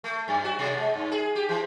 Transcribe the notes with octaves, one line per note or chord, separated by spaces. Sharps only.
A3
F#2
F#4
B2
G#3
G2
G#4
G4
E3